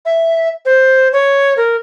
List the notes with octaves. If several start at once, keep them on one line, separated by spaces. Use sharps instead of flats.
E5
C5
C#5
A#4